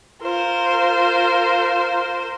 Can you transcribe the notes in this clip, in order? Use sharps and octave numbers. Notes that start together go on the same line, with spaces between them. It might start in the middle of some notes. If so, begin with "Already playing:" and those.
F4 A#4 C5